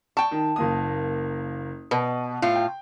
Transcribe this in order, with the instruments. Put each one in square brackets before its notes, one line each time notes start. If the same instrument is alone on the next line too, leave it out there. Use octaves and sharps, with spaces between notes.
[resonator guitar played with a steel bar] G5 A5 [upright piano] C#6
[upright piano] D#3
F#1 A#3 D#6
[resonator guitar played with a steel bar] B2 [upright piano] B4
[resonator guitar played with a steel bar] A2 F4
[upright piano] G5